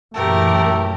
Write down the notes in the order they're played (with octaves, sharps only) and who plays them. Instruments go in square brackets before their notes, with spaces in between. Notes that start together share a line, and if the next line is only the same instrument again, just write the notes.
[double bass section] F#2 A#2 E3 [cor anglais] A3 [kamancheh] G4 A#4